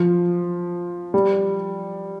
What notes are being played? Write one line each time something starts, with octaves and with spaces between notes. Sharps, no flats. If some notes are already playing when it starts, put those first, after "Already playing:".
Already playing: F3
G3